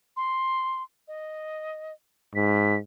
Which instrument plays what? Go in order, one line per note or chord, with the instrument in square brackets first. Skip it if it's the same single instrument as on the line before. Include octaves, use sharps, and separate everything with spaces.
[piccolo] C6
D#5
[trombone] G#2 [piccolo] B6